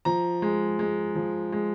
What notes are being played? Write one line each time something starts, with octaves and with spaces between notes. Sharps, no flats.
F3 A#5
G#3
G#3
F3
G#3